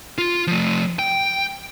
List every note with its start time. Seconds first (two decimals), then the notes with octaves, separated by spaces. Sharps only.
0.18 F4
0.47 F3 A3
0.99 G5